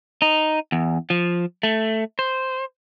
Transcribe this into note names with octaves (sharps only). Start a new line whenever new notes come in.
D#4
E2
F3
A3
C5